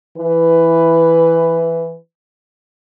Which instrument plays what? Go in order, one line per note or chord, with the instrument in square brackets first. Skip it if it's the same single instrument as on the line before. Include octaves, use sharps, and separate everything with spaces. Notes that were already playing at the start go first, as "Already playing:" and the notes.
[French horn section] E3 B4